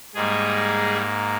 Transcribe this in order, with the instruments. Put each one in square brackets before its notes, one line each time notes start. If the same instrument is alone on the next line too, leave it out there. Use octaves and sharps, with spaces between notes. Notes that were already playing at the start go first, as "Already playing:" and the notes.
[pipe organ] G#2 G3 G#3 A#3 G#4